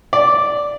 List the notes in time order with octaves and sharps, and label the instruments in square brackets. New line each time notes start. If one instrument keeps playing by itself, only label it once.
[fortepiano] D5